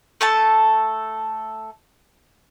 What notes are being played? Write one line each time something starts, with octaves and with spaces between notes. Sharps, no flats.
A3 A4 A5